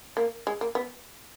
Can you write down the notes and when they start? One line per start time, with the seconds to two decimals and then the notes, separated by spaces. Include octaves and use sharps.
0.17 A#3
0.47 G#3
0.61 A#3
0.75 B3